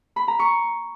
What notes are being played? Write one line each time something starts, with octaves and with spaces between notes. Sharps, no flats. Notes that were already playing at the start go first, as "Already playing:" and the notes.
B5
A#5
C#6